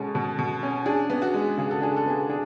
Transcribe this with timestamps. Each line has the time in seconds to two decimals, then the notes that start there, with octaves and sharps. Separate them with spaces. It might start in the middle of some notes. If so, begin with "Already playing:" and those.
Already playing: B2 G#3 C#4 A4
0.15 B2
0.39 B2
0.63 C#4
0.86 D4 G#4
1.10 B3
1.22 F#4
1.34 G#3
1.57 C#3 G#4
1.71 A4
1.81 D4 G#4
1.96 A4
2.06 B3 G#4
2.30 D4 G#4